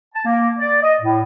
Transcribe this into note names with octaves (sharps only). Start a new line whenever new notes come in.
A5
A#3
D5
D#5
A2